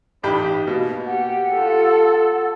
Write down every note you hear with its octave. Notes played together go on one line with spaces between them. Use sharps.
A1 D#4 G4 B5
B2 A#3
G4 F#5
F4 A4